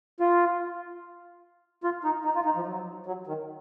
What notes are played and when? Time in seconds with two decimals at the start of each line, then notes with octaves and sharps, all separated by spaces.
0.20 F4
1.84 F4
2.04 D#4
2.25 D#4
2.35 F4
2.45 D#4
2.56 F3
2.66 F#3
3.06 F#3
3.27 D#3